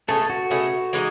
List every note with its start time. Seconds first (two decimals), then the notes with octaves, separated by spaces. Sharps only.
0.08 B2 A3 C#4 G#4 A4
0.30 F#4
0.50 B2 A3 C#4 G#4
0.93 E3 G#3 D#4